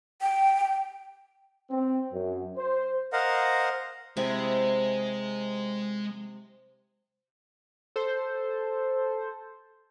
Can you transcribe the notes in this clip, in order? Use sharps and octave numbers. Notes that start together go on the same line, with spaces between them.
G5
C4
F#2
C5
A#4 C5 D#5 F5 F#5
C3 G#3 E4 G#5
A4 C5